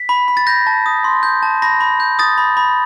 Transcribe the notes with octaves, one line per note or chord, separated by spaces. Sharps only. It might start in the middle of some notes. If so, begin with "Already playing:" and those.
Already playing: B6
B5
B5
A6
G6 A#6
A5
D#6
C6
G6
A5
B5 A#6
B5
G6
D#6 A6
B5
B5